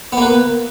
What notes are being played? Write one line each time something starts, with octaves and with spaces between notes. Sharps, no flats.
A#3 B3 B4